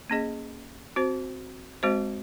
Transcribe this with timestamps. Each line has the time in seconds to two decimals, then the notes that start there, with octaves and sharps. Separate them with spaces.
0.10 A#3 C#4 G#4 D#5
0.96 C4 F#4 C5
1.83 G#3 C4 F#4 C5 D#5